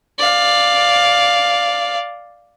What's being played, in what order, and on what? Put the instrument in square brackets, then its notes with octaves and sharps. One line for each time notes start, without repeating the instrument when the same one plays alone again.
[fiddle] D5 F5